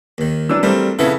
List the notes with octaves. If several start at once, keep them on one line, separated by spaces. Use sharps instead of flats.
D#2 D#3
E3 F#3 D4 E6
G3 A3 C4 A#4
F2 C#3 B3 E4 A4 B4 C#5